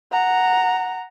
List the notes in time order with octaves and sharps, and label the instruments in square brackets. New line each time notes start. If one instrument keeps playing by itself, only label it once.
[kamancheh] F#5 A#5